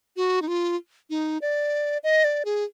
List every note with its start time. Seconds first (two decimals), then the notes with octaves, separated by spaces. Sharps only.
0.17 F#4
0.42 D#4
0.48 F4
1.10 D#4
1.42 D5
2.04 D#5
2.24 D5
2.45 G#4